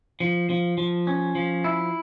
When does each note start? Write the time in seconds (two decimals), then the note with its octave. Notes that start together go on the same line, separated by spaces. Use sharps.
0.20 F3
0.50 F3
0.78 F3
1.07 C#4
1.35 F3
1.64 E4